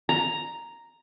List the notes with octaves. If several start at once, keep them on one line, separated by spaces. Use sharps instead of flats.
A#5